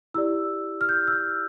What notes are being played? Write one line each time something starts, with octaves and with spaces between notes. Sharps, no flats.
E4 G4 D5 E6
F6
G6
E6
F6